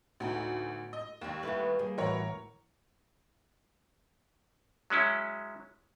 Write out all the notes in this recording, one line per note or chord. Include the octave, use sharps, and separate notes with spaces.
D2 A2 D3 B3 D#4
D#5
D#2 C4 D4
G3 A3 B3 C4 E4 B4
G3 A#3 G#4
A1 E3 F#4 A#4 B4 C#5
F#3 G#3 C#4 E4